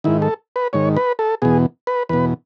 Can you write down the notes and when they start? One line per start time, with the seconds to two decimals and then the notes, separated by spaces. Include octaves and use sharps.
0.04 G#2 D#3 E4
0.22 A4
0.56 B4
0.73 G#2 D#3 C#5
0.97 B4
1.19 A4
1.42 E2 B2 G#4
1.87 B4
2.09 E2 B2 B4